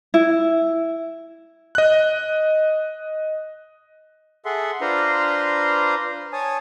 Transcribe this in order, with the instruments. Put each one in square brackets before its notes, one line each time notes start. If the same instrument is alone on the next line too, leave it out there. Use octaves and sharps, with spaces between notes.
[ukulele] E4
[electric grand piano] D#5 F#6
[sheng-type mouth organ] G#4 A4 E5 F#5 C6
D4 F4 B4 C5 A#5 C6
C#5 G#5 A5 D#6